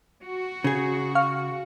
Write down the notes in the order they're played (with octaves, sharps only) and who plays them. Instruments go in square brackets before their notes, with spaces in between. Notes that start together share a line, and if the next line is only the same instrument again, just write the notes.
[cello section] F#4
[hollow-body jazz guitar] C#3 G#4
[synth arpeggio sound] F5 C#6 F6